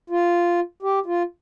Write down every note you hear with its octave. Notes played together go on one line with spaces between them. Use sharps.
F4
G4
F4